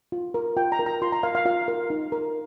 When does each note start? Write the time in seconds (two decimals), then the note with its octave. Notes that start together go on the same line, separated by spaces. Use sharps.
0.12 F4
0.34 A#4
0.56 F4 G5
0.72 A#5
0.79 A#4
0.86 A#5
1.02 F4 C6
1.12 A#5
1.23 A#4 F5
1.35 F5
1.45 F4 F5
1.68 A#4
1.90 D#4
2.12 A#4